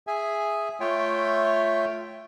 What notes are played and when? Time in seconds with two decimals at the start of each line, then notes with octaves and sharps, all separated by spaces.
0.07 G#4 E5 G#5
0.80 A3 F4 C#5 E5 G5